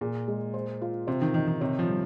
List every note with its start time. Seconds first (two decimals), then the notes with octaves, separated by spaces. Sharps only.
0.01 A#2 G#4
0.28 G#3
0.54 C5
0.81 F4
1.07 C3 C5
1.22 D#3
1.34 D#3 D#4
1.47 D#3
1.61 C3 C#5
1.79 F3
1.88 G3